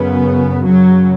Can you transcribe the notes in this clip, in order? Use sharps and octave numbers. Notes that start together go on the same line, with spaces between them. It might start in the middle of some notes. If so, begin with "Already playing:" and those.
Already playing: F#2 C#3 B3
F#2 C#3 F#3